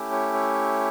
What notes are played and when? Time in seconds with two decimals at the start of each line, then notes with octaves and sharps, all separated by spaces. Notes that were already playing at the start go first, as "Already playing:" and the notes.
Already playing: A3 C#4 E4 G4
0.12 C#5
0.34 C#5